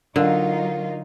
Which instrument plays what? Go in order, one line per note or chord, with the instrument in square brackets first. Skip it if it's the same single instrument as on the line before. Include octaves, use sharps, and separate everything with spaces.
[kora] D3 [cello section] F#3 D#4 F4 [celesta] A#4 F5